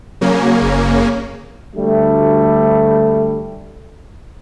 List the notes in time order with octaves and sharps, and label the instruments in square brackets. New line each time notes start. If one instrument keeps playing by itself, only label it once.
[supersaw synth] C#3 A#3 C#4 [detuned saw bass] F#3
[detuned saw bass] F#1
[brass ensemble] D2 G3 A3